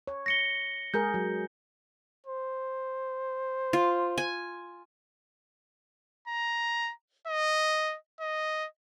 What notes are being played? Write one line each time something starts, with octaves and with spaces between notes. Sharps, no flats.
C#5
A#6 C#7 G7
G#3 G#4 A#4 G6
F#3
C5
F4
G#5
A#5
D#5
D#5